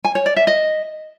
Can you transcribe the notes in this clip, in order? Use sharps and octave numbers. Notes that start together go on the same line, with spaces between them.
G#5
C#5
D5
E5
D#5